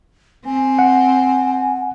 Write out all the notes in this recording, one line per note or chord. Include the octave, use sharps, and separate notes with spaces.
C4 G#5
F#5